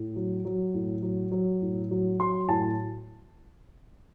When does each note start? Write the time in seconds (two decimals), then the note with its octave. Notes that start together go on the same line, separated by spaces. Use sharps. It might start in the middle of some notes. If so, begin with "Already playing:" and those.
Already playing: A2
0.16 F#3
0.45 F#3
0.74 A2
1.02 F#3
1.32 F#3
1.62 A2
1.91 F#3
2.19 F#3 C6
2.48 A2 A5